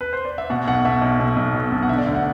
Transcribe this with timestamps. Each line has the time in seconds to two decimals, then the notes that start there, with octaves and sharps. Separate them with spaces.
0.01 B4
0.13 C5
0.25 D5
0.38 E5
0.50 B2 F#5
0.67 B1 F#5
0.85 B2 E5
1.02 B1
1.20 B2
1.36 B1
1.54 B2
1.72 B1
1.83 F#5
1.89 D3 E5
1.98 D5
2.06 D2 E5
2.15 F#5